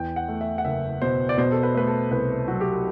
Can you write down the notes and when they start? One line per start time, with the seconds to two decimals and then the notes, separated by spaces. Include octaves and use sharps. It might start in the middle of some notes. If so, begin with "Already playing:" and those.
Already playing: E2 G5
0.16 F#5
0.29 A3
0.41 E5
0.58 F#5
0.65 F#1 E5
1.02 B2 C5
1.29 D5
1.38 B2 C5
1.52 A4
1.63 B4
1.75 A3 B4
1.87 A4
2.11 C2 B4
2.48 F#3 F#4
2.61 G4